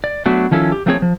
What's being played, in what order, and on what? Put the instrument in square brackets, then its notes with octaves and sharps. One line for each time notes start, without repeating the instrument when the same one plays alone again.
[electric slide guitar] D5
F#3 A3 B3 D4 F#4
D#3 F3 C#4 E4 A4
G4
F3 A3 A#3 C4 G#4 C#5
F3